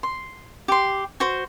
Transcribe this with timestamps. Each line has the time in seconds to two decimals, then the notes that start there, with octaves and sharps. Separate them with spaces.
0.03 C6
0.68 G4 C6
1.20 F#4 C5